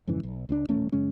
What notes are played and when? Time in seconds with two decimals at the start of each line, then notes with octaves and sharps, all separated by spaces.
0.07 F2 G#2 C#3 E3
0.23 B1
0.49 C#2 C4 D4
0.69 D#1 A1 A3 C#4
0.92 F#2 C#3 G#3 C#4